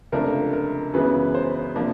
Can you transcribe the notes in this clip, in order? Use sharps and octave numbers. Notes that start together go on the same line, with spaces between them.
C#2 C3 F3 A3 D4 A#4
A#4
F#2 C#3 E3 G#3 B3 B4
C5
C3 F3 A#3 D4